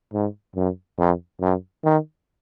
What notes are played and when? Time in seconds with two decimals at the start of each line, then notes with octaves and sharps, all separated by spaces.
0.13 G#2
0.56 F#2
0.98 F2
1.41 F#2
1.84 D#3